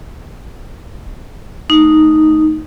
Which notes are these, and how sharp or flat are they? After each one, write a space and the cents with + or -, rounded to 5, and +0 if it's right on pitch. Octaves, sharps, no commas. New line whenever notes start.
A3 +0 D#4 +0